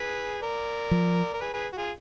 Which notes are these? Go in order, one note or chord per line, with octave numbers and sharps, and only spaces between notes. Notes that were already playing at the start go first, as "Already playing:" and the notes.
Already playing: G#4 B4
A#4 D5
F3
A#4
G#4 B4
G#4 B4
F#4
F4 G#4